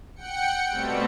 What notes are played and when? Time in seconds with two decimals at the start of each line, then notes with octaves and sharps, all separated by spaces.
0.16 F#5 G5 C#7
0.69 B2 G3 A3 C4